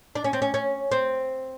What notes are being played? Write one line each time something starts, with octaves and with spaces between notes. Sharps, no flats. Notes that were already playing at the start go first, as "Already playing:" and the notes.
D4
C#4
C4
C#4
C#4
C4